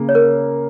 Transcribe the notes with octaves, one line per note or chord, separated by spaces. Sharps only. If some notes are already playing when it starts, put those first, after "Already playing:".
Already playing: C#3 A#3
C#5
A#4